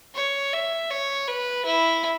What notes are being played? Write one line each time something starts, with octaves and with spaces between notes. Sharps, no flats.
C#5
E5
C#5
B4
E4